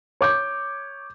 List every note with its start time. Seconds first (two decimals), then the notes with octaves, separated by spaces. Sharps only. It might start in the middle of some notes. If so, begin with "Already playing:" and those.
0.21 C#5 D6 G6